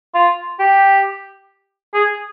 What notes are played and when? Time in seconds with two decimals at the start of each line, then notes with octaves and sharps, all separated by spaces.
0.14 F4
0.60 G4
1.94 G#4